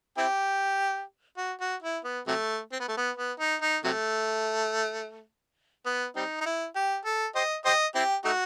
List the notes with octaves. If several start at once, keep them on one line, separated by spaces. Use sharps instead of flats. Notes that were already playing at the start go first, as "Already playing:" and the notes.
C4 E4 G4
F#4
F#4
E4
B3
C3 F#3 A3
C4
B3
A3
B3
B3
D#4
D#4
C3 F#3 A3
B3
G3 C4 D#4
D#4
E4
G4
A4
G4 C5 D#5
G4 C5 D#5
C4 E4 G4
A3 D#4 F#4